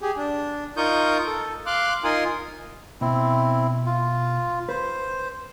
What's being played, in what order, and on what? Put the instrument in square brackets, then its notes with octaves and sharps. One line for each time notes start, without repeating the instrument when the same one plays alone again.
[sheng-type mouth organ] G4 G#4
D4
D#4 F4 A#4 C#6 D#6 G6
A4
F5 C6 D6 F#6
D#4 F4 A#4 G#5 C6 D#6
[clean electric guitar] B2 [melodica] C4 E4
[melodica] F4
[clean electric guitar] B4 [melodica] C5